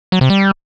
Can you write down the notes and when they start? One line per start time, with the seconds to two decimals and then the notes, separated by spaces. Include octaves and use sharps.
0.12 F#3
0.21 C3
0.30 G3